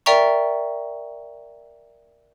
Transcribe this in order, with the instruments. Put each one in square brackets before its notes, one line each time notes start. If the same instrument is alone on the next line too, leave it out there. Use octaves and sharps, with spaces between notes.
[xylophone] A#4 D5 E5 G5 A#5 C#6